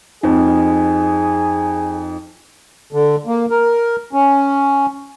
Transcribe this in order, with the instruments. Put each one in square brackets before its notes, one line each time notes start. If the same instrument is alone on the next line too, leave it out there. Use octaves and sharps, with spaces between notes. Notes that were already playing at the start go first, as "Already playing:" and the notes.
[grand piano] F2 [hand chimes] D#4 C5 [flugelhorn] G#4
[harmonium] D3
A#3
A#4
C#4